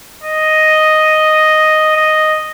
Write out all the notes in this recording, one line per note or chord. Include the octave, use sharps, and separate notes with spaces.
D#5
D#5